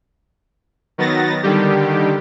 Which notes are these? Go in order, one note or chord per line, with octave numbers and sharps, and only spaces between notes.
D#3 F#3 B3 A6 A#6
D3 D#3 G3 G4